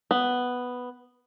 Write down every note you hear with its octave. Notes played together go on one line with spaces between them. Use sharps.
B3